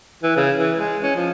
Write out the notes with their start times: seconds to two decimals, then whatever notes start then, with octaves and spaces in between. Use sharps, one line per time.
0.23 E3
0.36 C#3
0.58 E3
0.76 G#3
1.03 C#4
1.16 F3